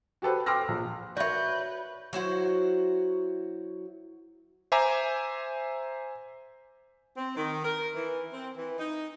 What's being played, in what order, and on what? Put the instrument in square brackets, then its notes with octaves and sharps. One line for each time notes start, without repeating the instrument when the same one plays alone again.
[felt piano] F#4 G4 A4 B4 C5
G5 C6 D6 E6 F6 A#6
A#1
[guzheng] F#4 C#5 [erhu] B4 [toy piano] D5 E5 [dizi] G6
[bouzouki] F#3 E4 F#4 C5
[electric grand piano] C5 E5 G#5 A#5 D6
[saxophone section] C4
D#3
A#4
E3
C4
E3
D#4